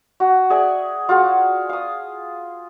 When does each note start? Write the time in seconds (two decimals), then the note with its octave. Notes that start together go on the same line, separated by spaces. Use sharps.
0.20 F#4
0.50 G#4 D5 E5 G#5
1.09 F4 F#4 G#4
1.69 F5 D#6